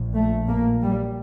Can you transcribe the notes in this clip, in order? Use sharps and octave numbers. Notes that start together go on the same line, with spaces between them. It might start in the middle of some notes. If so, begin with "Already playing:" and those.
Already playing: A#1 A#2
A3
A#3
G3